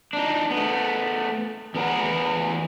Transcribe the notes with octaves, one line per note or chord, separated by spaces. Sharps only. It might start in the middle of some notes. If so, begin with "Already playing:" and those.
D4 D#4
A3 B3
E2 B3 A#4 F#5